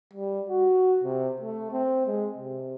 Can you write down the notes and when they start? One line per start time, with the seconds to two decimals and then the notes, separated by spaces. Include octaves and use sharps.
0.14 G3
0.49 F#4
1.04 C3
1.41 A3
1.71 C4
2.06 G#3
2.38 C3